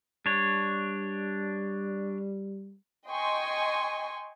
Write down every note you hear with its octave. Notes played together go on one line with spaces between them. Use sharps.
G3 D4 C#5
D#5 G5 G#5 C6 C#6